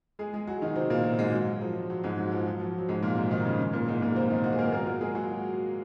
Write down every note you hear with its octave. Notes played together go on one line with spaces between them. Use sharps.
G#3 G#4
G#3 G#4
F#3 F#4
D#3 D#4
C3 C4
A#2 A#3
F#3
G#2 G#3
F#3
F3
F#3
G#2 G#3
F#3
F3
F#3
F3
F#3
G#2 G#3
A#2 A#3
C3 C4
D#3 D#4
C#3 C#4
A#2 A#3
G#2 G#3
A#2 A#3
C3 C4
D#3 D#4
F#3 F#4
G#4
A#3 A#4
A#3 A#4
F4
F#3 F#4
G#3 G#4
F#3 F#4